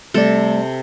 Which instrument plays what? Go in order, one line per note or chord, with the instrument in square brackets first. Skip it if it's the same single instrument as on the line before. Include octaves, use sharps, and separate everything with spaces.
[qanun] C3 A4 [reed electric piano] G3 A3 D5